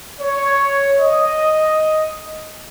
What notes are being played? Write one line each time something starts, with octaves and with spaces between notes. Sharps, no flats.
C#5
D#5